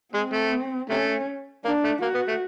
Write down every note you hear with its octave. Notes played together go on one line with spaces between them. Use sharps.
G#3 C4
A3
C3 A3 C#4
A#3 D4
A3
A#3 F#4
B3
A3